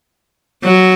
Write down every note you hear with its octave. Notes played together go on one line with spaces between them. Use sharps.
F#3